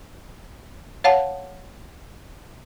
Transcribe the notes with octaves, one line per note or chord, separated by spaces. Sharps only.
C#5 F5 F#5 A5